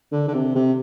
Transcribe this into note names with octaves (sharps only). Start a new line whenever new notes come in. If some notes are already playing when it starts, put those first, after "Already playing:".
D3
D3
C3
C3